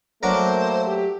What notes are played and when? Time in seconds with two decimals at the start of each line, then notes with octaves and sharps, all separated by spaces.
0.23 F#3 A3 A#3 D4 A#4 C5
0.86 G4